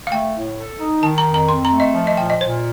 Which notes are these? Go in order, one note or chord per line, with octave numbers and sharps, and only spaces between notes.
F5
A3 G5
A2
A4
D#4
D#3 A5
A#5
F2
A#5
C4 C6
A#5
A3
D#5
F3
D#5
A#2 G5
D#5
A#2 C5